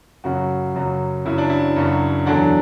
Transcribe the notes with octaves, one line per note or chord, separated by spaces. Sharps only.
F#2 C#3 F#3 F#4
F#2 C#3 F#3
F#2 C#3 F#3 E4
D4
E4
F#2 C#3 F#3
E2 D3 F#3 D4